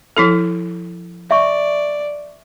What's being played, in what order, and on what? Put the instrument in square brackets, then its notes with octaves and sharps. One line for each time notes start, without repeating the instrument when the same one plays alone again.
[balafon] F3 E4 A4
[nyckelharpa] D5 [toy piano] E5 C#6